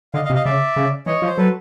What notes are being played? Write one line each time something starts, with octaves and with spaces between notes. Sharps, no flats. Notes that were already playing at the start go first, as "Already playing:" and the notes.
D3 D#5 F5
D#5 F5
C3
D#5 F5
C#3 D5 E5
C#3
E3 C#5 D#5
F3
C5
F#3 A4 B4